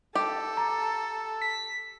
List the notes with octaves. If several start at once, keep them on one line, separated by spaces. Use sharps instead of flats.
G4 A4
A#5
B6